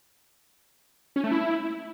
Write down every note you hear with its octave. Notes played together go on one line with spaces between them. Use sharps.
C#4
A3
E4